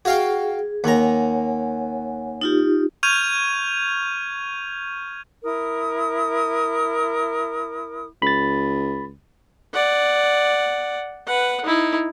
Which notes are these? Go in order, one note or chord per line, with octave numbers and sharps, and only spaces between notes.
F#4 G#4 F5 G5
D#2 C#5 F#5 G#5 A#5
D#4 F4 G4
C#6 F6 G6 G#6 D#7 F7
E4 A#4 D#6
C#2 B5 A6
D5 F#5
B4 F#5
D#4 E4